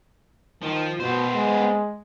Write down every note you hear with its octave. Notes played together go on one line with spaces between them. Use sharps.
D#3 F3
B2 B3 C5
G#3